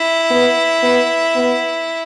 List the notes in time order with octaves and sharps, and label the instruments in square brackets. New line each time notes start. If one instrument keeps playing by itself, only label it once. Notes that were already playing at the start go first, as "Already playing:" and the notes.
Already playing: [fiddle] E4
[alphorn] B3
B3
B3